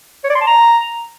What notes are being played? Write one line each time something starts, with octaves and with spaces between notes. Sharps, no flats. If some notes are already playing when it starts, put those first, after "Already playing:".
C#5
D5
C6
A5
A#5